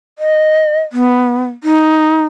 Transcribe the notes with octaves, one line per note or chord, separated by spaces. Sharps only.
D#5
B3
D#4